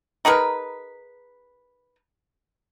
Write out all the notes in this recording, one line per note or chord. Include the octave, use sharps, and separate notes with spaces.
D#4 G#4 A#4 B4